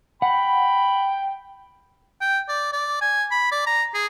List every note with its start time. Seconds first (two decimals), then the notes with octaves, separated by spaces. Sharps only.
0.22 F#5 G5 B5
2.21 G5
2.49 D5
2.73 D5
3.01 G#5
3.31 B5
3.51 D5
3.66 A#5
3.94 G#4